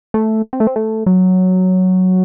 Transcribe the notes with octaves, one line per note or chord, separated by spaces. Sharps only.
A3
C4
A3
C4
A3
F#3